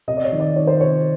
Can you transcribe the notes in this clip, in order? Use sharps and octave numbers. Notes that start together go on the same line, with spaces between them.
C3 D#5
D5
C#5
D#3
D5
D#3 C#5
C5
C3 C#5